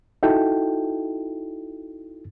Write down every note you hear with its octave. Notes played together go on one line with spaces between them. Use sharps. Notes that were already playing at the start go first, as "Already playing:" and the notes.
D#4 E4 F#4 A4 G5